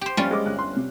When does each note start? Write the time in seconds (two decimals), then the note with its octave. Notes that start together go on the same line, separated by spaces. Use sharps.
0.01 G4 C5
0.17 A#1 G3 C#4 F4
0.31 G#3 D6
0.45 G1 F6 F#6
0.59 C6
0.76 C3